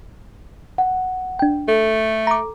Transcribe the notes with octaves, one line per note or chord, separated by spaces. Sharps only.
F#5
D4 G5
A3 A4
A#5 D6